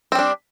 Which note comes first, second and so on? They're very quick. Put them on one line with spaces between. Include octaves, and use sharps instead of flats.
C4 G3 D4